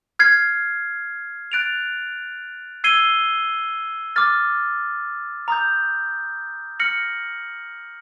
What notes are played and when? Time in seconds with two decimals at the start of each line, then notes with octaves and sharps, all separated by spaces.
0.19 F6 G#6 C7
1.52 F#6 A6 D7 F7
2.84 E6 G#6 C7 D#7 G7
4.16 D6 F6 A6
5.48 A#5 D#6 G6
6.80 F6 A#6 C#7 F#7